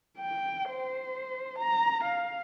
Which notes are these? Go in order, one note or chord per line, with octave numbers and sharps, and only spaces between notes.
G5
C5
A#5
F5